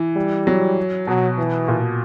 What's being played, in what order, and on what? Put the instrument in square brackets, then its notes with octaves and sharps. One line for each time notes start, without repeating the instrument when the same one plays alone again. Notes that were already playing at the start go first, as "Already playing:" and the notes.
Already playing: [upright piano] E3
[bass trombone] G3
[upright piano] F#3
[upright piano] B2 [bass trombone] F#3
[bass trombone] E3
[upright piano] A#2